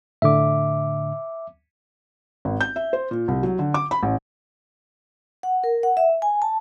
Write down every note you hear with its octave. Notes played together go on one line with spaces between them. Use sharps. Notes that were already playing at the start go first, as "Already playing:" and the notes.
A2 D3 E5 D6
G#1
G6
E5
C5
A#2
C2
F#3
D3
D6
B5
A1
F#5
A#4
F#5
E5
G#5
A5